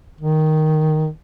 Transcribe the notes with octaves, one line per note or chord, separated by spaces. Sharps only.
D#3